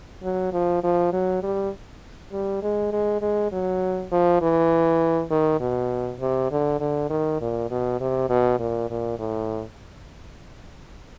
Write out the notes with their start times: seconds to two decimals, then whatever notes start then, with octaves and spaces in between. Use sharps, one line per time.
0.23 F#3
0.53 F3
0.83 F3
1.13 F#3
1.42 G3
2.32 G3
2.63 G#3
2.93 G#3
3.22 G#3
3.52 F#3
4.12 F3
4.42 E3
5.31 D#3
5.61 B2
6.20 C3
6.51 D3
6.80 D3
7.10 D#3
7.41 A#2
7.70 B2
8.00 C3
8.29 B2
8.59 A#2
8.90 A#2
9.19 A2